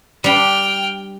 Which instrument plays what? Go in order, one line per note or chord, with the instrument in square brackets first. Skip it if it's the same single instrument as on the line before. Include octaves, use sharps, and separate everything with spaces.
[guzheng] G3 D4 [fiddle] G5 F6